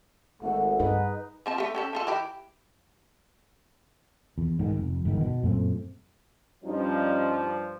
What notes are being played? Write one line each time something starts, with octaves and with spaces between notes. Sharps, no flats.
G#1 A3 F#5
G2 D#4 G#4 B4
F3 C4 A5
A3 G4
C#4 G4 A4
A3 F4 A4
E3 E4 G4
E2
G#2 D3 D#3
F1
G1 E2 G#2 D#3
B2
F#2 A#2 A3 C4
G2 F3 G3 C#4 D#4